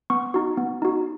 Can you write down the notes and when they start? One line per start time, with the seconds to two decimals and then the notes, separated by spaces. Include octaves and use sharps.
0.10 B3 C#6
0.34 D#4 F#4
0.57 B3
0.82 D#4 F#4